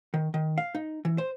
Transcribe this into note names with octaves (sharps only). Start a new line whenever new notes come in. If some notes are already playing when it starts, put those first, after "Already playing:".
D#3
D#3
F5
D#4
E3
C5